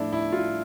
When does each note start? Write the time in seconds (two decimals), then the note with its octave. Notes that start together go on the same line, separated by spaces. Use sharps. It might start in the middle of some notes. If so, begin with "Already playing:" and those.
Already playing: A2 F3 A3 D4 E4
0.13 E4
0.32 F4